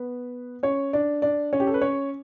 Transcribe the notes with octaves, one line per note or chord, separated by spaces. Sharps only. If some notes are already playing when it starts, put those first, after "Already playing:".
Already playing: B3 B4
C#4 C#5
D4 D5
D4 D5
C#4 C#5
G4
A4
B4
C#4 C#5